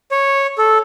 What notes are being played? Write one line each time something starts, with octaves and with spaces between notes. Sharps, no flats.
C#5
A4